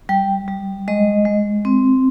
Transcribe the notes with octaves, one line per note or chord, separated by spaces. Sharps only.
G3 G5
G3
G#3 D#5
G#3
C4